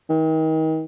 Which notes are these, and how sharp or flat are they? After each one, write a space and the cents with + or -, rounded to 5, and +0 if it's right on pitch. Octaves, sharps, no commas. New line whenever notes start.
D#3 +35